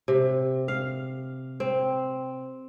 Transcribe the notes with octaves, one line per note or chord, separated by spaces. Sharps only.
C3
F5
C4